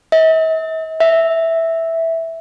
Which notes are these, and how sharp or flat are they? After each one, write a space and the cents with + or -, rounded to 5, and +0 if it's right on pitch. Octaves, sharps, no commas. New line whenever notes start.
E5 -45
E5 -5